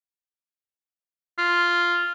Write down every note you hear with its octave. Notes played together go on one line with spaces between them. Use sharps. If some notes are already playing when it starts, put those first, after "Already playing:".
F4